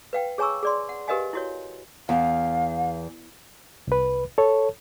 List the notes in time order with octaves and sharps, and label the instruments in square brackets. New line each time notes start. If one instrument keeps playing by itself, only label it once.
[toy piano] B4 F5 G5
G#4 C#5 G#5 A#5 C#6 E6
G#4 D5 C6
F#5
G4 A#4 B4 D#5 F5 G#5
E4 F#4 C#5
[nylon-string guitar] E2 [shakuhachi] F5
[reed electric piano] C2 B4
A4 C#5